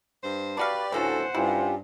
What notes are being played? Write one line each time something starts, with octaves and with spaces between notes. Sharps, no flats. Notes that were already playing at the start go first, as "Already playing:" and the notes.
G2 C5
D4 F#4 G4 B4 D5 F5
D2 A2 E3 F3 C#4 A4 C5 F#5
G2 C#4 E4 F4 G4